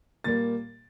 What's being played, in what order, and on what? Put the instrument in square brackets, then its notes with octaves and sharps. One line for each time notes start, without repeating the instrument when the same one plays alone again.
[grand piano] A#2 G3 A#3 A6